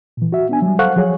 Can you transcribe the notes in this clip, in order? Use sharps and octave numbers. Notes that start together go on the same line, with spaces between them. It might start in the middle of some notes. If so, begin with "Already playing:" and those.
A#2 E3
F#4 E5
B3 D4 G#5
F#3 G3
A4 C5 F5 F#5 C#6 F#6
F3 F#3 G#4 C#5